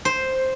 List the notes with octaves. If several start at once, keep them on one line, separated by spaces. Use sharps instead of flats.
C5